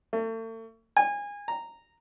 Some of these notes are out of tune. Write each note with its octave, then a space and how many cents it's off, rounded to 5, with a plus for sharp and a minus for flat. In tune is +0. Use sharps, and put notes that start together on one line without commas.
A3 +40
G#5 -25
A#5 -10